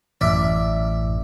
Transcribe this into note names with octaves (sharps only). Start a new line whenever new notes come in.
A1 F#2 D5 E5